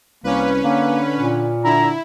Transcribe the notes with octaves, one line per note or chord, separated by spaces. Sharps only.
C2 A#3 C#4 B4
D3 A#3
A#2
D3 E4 A#5